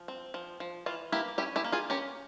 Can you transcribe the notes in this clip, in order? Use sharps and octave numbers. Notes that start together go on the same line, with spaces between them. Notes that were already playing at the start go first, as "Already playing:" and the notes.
Already playing: F3
C4
F3
F3
E3 F4
A#3 E4 G4
C#4 E4 G4
E4 G4
A#3
F4 G#4
C#4 G4 A#4